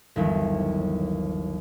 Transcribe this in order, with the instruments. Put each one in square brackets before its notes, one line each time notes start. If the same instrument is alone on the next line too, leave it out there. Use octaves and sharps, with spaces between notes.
[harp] G1 D#2 E3 F#3 B3